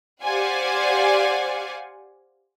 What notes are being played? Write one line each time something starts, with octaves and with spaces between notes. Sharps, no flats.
G4 C5 D5 F5 F#5 G#5